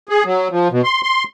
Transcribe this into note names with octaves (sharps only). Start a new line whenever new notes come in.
G#4
F#3
F3
B2
C6
C6